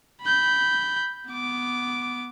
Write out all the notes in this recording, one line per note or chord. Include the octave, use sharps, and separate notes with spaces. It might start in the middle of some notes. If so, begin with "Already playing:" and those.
B5 G6
B3 D6